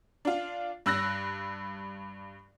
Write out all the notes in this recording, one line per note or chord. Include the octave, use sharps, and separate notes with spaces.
D4 F4
G2 E6 F#6 A#6